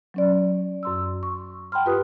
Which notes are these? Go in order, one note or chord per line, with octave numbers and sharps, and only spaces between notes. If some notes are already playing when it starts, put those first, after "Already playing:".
F#3 C#4 D5
F#2 C6 E6
C#6
F#5 G5 A5 B5 C6 F6
G2 F4 G4 B4 D#6 F#6